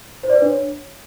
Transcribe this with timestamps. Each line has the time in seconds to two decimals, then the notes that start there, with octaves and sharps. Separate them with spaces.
0.23 C5
0.30 D5
0.36 B4
0.42 D4
0.48 C#5